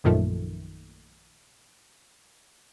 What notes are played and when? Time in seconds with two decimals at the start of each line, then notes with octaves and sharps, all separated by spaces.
0.04 A#1 F#2 A#2 D#3 F3 A3